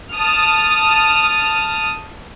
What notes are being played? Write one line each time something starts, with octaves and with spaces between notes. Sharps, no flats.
A5 D#6 F6